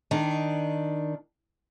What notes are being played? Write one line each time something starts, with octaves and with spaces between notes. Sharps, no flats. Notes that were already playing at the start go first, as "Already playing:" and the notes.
D#3 D4